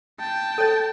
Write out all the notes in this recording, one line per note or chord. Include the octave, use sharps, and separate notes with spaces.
G5 A5
A4 C#5